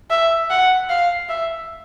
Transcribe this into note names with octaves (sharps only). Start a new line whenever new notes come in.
E5
F#5
F5
E5